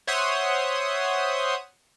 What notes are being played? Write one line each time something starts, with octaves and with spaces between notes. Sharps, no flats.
C5 C#5 E5 F#5 C6 D#6